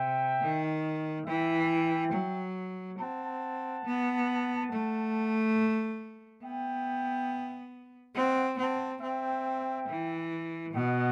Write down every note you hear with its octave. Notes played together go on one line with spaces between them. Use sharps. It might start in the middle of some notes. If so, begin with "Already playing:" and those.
Already playing: C3 E5 G5
D#3
E3 E5 G5
F#3
C4 F#5 A5
B3
A3
B3 E5 G5
C4 D#5 F#5
C4 F#5 A5
C4 E5 G5
E3
B2 D#5 F#5